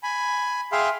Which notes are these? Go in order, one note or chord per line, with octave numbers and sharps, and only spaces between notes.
G#5 B5
G#4 E5 F5 G5 C6